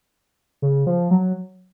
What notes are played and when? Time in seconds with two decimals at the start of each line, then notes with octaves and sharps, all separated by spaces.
0.62 C#3
0.87 F3
1.11 F#3